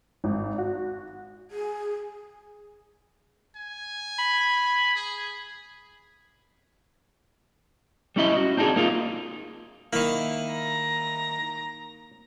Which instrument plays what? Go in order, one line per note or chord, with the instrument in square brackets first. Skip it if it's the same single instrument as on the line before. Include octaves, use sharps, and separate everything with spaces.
[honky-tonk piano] G#1
F#4
[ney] G#4
[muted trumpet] G#5
[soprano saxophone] B5
[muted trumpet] G#4
[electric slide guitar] G3 C#4 E4 D#5
F#4
C4 D4 D#4 F#4 G#4
A#3 D#4 F4
[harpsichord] D#3 E4 [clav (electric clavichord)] A#3
[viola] A#5